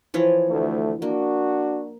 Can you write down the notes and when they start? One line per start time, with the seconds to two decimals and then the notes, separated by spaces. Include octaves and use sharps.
0.14 E3 F3 C#5
0.49 D2 A3
1.02 A#3 D4 F#4